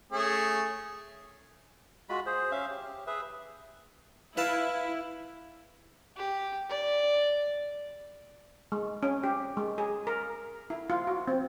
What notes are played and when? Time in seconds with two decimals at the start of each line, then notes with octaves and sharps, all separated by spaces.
0.12 A3 C#4 G#4
2.09 G#3 F4 F#4 B5
2.26 G#4 C5
2.51 C#4 E5 F5
2.70 G4
3.07 G#4 B4 E5
4.37 E4 B4 F5 A5
6.17 G4
6.69 D5
8.72 G#3
9.03 C#4
9.24 G4
9.57 G#3
9.78 G#4
10.07 A#4
10.70 E4
10.90 F4
11.07 F#4
11.28 C4